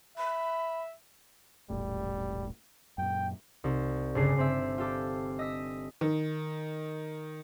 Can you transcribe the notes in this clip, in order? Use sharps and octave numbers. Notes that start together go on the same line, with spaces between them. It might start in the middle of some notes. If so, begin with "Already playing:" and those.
E5 B5
E1 A#1 A2 G3
F#2 A#2 G5
C2 D#4
G1 C#3 D4 G#4 C7
G1 C4 E5
F4 G4 A4 D6
D#5 E6 B6
D#3